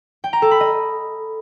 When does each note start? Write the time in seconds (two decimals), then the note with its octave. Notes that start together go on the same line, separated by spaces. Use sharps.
0.24 G5
0.33 A#5
0.42 A4
0.51 B5
0.60 D#5